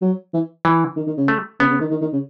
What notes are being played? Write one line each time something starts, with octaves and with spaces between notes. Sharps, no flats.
F#3
E3
E3
D#3
D#3
C#3
A3
C#3 B3
C#3
D#3
D#3
D#3
C#3